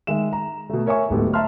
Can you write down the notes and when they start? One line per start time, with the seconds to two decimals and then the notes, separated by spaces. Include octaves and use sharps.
0.07 D#3 G#3 E5 E7
0.33 A#5
0.70 B2 A3
0.86 A#4 C#5 E5 G#5 C#6
1.10 D1 G#2 B3 G4 A4
1.34 E5 A5 A#5 C6 F6